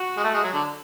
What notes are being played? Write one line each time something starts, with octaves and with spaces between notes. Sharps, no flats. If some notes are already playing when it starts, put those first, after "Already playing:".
Already playing: F#4
G#3
A3
G#3
F#3
D3